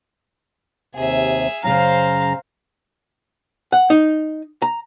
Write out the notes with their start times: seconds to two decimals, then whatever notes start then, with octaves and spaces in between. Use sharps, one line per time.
0.95 D#2 C3 G#4 E5
1.64 F#2 C#3 C5 F5 A#5
3.72 F#5
3.90 D#4
4.62 A#5